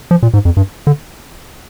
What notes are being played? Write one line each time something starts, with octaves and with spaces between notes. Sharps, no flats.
F3
A#2
G#2
F2
G2
D3